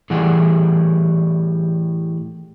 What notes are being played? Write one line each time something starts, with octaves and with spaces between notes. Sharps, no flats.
A2 E3 G3 G#4 F#5